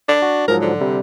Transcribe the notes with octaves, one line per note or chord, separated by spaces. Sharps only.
D4
F#4
G#2 F3 F#3 A#4
D3
C3 G3